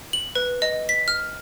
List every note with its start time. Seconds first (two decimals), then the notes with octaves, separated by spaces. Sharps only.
0.13 F#7
0.35 B4
0.62 D#5
0.89 B6
1.08 F6